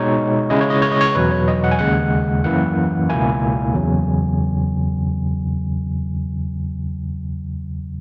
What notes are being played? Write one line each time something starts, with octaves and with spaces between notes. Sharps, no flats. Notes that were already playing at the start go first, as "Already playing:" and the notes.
Already playing: B2 G#3 D#4 C#5
C#3 G#3 C#4 E4 D#5
C#5
D#5
C#5
D#5
C#5
E2 B2 F#3 B4
C#5
D#5
F#5
G#5
D#2 C#3 G#3 F#5
F#2 E3 A#3 E4 F#5
C#2 B2 A#3 E4 G#5
E2 C#3 F#3